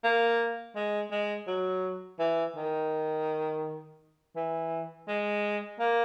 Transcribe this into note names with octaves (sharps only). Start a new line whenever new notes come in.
A#3
G#3
G#3
F#3
E3
D#3
E3
G#3
A#3